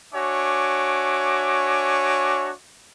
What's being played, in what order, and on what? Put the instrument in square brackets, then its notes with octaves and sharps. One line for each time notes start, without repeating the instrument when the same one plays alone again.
[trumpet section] D4 F#4 C#5 E5 G#5 D6